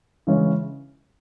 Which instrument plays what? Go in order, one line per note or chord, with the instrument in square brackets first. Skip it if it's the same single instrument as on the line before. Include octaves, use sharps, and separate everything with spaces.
[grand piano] C#3 E3 G#3 C#4